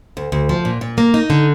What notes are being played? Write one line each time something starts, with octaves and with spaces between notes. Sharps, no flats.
D2
D2
F3
A#2
A#2
A#3
D#4
D3